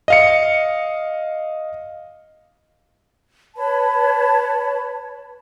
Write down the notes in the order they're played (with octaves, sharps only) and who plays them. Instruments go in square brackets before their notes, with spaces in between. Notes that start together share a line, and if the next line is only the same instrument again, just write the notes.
[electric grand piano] D#5 F5 C#7
[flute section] B4 C#5 A5 B5